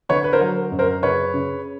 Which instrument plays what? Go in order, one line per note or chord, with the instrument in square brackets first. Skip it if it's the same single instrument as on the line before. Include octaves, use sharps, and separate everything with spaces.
[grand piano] D3 B4 C#5
B4
A#4 C5
F#3
F#2
A#4 C5
C#3 B4 C#5
C#3